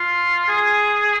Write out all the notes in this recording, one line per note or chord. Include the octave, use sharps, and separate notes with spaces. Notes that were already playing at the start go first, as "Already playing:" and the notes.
Already playing: F4
G#4